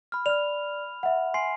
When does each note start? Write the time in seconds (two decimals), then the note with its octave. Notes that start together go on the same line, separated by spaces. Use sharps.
0.12 B5 F6
0.26 D5 F6 F7
1.03 E5 F#5
1.34 G#5 C6 C7